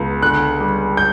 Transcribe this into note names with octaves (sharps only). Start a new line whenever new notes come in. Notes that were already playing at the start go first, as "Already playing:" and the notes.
Already playing: C#2 B3
D3 F#6
G3
G6